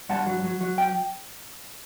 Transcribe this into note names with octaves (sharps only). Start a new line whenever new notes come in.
G2 F#5 A5
F#3
F#3
F#3
G5